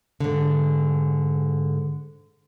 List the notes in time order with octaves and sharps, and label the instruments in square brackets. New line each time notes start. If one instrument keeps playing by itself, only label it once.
[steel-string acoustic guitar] G#2 D3